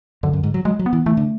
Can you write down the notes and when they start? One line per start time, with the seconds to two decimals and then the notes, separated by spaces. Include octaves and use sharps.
0.23 F#2 D3
0.33 F#2
0.43 G#2
0.54 F#3
0.65 F#3 G#3
0.79 F#3
0.86 B3
0.93 E3
1.06 E3 A3
1.17 D3